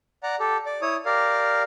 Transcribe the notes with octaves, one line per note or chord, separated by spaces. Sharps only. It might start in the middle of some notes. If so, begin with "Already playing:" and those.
D5 F#5 A#5
G4 A4
D5
E4 C#5 D#6
G4 A#4 D5 F5